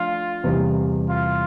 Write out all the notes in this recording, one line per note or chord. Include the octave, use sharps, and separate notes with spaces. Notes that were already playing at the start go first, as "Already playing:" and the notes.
Already playing: F3 A3 D4 F4
E2 C3 E3 G3
F4